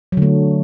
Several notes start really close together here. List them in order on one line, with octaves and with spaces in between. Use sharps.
F#3 D3 A3